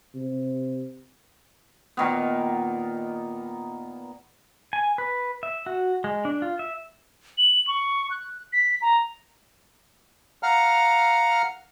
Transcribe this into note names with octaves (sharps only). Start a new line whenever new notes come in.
C3
A#2 D#3 B3
G#5
B4
E5
F#4
G#3
D4
F4
E5
F#7
C#6
F#6
B6
A#5
F5 F#5 A#5 F6